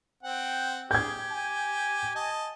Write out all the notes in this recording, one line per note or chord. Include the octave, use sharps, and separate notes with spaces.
C4 F#5 G5
G4 G#4 G6 G#6
G#5
D#5 A5